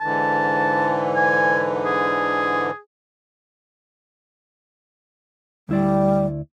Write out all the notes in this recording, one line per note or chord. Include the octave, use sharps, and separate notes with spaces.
G#2 D3 E3 A5
G#5
G#4
D2 G3 E4 D5